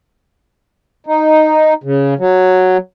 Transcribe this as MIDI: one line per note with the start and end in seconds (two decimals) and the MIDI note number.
1.06 1.74 63
1.84 2.14 49
2.19 2.77 54